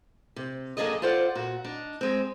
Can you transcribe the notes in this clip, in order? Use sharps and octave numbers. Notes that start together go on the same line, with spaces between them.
C3
F#2 A#3 D4 G#4 A4 D#5
F4 A4 C5 D5 F#5
A#2 F#4
D4 D#4
G#3 C4